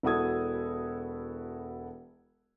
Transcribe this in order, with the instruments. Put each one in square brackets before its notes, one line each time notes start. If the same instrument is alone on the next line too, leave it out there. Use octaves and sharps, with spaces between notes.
[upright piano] E1 E4 F#4 A4 D#6 G#6